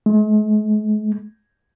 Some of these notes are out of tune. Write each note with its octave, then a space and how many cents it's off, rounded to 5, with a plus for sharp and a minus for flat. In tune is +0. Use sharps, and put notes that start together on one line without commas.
G#3 +45